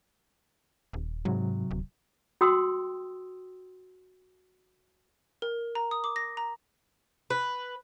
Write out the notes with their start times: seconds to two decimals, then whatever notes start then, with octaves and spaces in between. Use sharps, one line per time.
0.93 D#1
1.25 G#2 C3 F#3
1.71 D1
2.41 F#4 G5 C6 D#6 E6
5.42 A#4
5.75 A#5
5.91 D#6
6.04 D6
6.16 A#6
6.37 A#5
7.30 B4